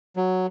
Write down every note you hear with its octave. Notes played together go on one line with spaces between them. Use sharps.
F#3